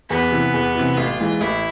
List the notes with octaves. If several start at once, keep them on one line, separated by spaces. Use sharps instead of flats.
E2 B3
C3 E3
E2
C3 E3
A1 F4
G#2 E3
A1 E4